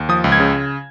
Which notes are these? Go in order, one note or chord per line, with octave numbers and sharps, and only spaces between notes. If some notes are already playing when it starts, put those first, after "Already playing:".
Already playing: D#2
F3 D#6
C#2
G#6
C#3